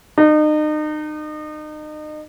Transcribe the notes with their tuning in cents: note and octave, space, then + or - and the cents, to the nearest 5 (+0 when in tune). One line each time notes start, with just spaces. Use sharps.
D#4 -35